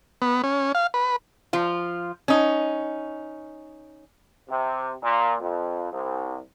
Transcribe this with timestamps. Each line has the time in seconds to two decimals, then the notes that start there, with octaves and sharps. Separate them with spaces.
0.22 B3
0.44 C#4
0.75 F5
0.94 B4
1.53 F3 F4
2.28 C#4 D#4
4.48 C3
5.01 A#2
5.40 F2
5.92 C2